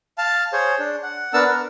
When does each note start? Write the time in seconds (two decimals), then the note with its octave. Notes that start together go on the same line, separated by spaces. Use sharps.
0.18 F5 A5
0.53 G#4 C5 C#5
0.79 D4
1.03 F#5
1.34 B3 D4 A#4 F#5 A5 E6
1.49 A#4